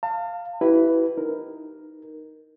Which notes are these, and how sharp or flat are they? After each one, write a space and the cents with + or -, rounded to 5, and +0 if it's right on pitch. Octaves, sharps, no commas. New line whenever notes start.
F5 +0 A5 +40
E4 +0 G4 -35 B4 +5
D#4 +0 A#4 +0